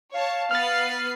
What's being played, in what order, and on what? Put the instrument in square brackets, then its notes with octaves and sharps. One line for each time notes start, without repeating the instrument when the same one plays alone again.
[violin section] C#5 A5 [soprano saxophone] F5
[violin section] B3 B4 C7 [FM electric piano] F6 A6